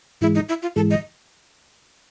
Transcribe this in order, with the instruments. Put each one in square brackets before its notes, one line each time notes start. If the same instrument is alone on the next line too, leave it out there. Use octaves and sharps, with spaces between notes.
[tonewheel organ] G#2 E3 G#3 [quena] E4
[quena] D#4
E4
F4
[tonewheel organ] G#2 E3 G#3 [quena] A4
[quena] D#5